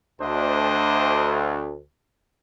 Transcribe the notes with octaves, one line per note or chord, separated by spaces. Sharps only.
D2 D4 C5 D#5